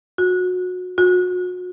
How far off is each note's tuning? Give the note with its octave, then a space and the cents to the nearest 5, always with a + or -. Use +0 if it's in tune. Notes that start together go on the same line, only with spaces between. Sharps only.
F#4 -25
F#4 -35